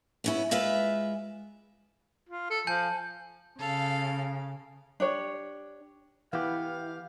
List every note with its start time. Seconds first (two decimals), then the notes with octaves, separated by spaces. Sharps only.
0.24 B3 C#4 E4
0.51 G#3 F4 B4 E5
2.29 F4
2.50 A4
2.67 F3 G#5 A5 G6
3.59 C#3 A4 F5
5.00 D4 G4 C#5
6.33 E3 B3 E4 G4 F5